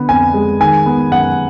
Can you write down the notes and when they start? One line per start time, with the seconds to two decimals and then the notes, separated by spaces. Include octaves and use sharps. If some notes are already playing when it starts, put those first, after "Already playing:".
Already playing: D3 B3
0.09 F2 G#5
0.34 G#3
0.60 D#3 G#5
0.86 B3
1.11 F#2 F#5